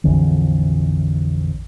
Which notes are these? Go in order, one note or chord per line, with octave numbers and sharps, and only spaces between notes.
A#1 F2 D3 E3